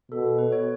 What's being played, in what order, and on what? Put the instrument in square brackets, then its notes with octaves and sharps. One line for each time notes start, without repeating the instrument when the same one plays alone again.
[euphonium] B2 [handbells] A4
[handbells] A4
B4
C#5